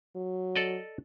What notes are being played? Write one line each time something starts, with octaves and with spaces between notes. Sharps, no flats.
F#3
A4 D5 D#5